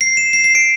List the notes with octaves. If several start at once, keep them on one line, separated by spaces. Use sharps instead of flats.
C7
E7
C7
C7
D7